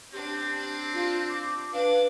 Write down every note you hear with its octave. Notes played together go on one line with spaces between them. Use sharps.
C4 D4 G4
D4
F4
D6
D4 B4 F5 D6